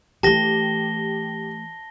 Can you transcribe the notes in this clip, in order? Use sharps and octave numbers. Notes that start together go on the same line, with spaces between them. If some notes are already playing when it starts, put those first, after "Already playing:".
E3 A3 G4 A5 A#6 G7